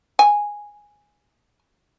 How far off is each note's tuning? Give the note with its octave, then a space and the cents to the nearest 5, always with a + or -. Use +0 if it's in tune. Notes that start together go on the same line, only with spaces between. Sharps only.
G#5 -5